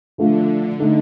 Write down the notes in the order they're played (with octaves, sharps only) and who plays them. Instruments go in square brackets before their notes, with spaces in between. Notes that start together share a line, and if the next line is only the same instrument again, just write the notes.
[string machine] D3 [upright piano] F3 A3 D4 F4
[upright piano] D3 A3 D#4